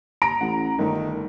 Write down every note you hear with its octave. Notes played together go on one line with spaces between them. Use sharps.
A#5 D7
A1 F#5
G1 D#3 A3